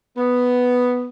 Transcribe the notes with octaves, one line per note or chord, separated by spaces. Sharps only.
B3